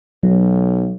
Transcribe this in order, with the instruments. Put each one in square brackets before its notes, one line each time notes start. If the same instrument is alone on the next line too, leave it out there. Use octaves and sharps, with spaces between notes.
[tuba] B1 [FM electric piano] F#3